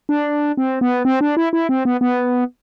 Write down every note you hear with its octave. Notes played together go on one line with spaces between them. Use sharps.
D4
C4
B3
C4
D4
E4
E4
C4
B3
B3